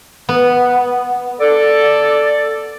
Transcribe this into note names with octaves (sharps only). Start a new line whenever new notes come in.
B3
A4 D5